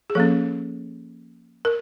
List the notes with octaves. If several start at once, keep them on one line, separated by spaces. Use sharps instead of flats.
G#4
F3 A#3 C#4 A4
A#4